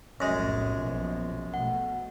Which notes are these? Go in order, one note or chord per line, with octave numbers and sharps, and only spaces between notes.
F1 B1 F#2 A2 G#3
A#1 B2 F3
B2 A3 F#5